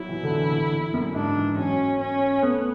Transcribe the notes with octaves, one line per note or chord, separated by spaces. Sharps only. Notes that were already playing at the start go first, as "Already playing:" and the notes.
Already playing: F#3 E4
E3
D3
E3
D3
F#2
G#2 D4
E3
F#3 C#4
C#4
A3 B3